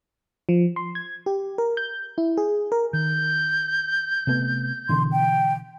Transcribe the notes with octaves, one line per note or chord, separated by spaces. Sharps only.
F3
C6
G#6
G4
A#4
G6
E4
G#4
A#4
D#3 G6
C3 A3 B3
B2 D3 E3 C6
G5